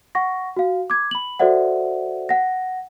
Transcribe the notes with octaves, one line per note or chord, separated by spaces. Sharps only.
F#5 C#6 A#6
F#4 F5
D6 G#6
B5 F#7
F#4 A4 C5 D5 E5 F#5
F#5 A#6